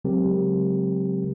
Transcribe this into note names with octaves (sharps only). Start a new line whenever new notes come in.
C#3 F#3 G#3 C4 G4 A#4